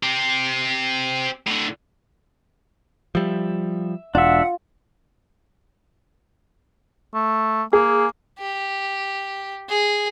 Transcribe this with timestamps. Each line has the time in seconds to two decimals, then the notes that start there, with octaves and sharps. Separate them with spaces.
0.03 C4 G4
1.47 A2 D3
3.15 F3 G3 E5
4.15 E1 D4 F4 E5 F#5
7.14 A3
7.73 A#3 G#4
8.38 G4
9.69 G#4